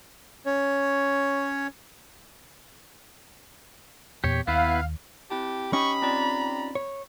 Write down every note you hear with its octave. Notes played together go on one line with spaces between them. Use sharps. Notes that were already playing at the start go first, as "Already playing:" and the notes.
C#4 C#5
E2 A#2 B3 G4 C#5
D#2 B3 E4 B4 F5
C4 E4 G4 A5
C#4 D#4 G4 B5 C#6 D#6
C4 F4 D5 A#5
C#5